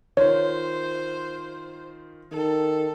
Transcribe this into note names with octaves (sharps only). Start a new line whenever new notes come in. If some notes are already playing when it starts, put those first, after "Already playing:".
D#3 F4 C5 C#5
D#3 A4